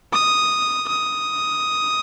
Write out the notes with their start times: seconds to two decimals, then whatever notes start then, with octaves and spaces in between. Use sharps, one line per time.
0.14 D#6
0.89 D#6